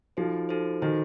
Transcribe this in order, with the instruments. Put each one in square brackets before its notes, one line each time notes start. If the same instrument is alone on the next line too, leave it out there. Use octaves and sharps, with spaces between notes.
[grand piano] F3 [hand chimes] D#4 F#4 A4 C5
[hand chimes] D#4 F#4 A4 C5
[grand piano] D#3 [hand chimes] D#4 F#4 A4 C5